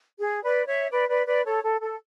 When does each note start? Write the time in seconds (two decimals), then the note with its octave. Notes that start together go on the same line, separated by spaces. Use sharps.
0.19 G#4
0.43 B4 D5
0.66 C#5 E5
0.90 B4 D5
1.08 B4 D5
1.26 B4 D5
1.45 A4 C#5
1.63 A4
1.81 A4